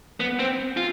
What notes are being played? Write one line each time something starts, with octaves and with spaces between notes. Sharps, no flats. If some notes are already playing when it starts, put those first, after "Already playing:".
B3
C4
F4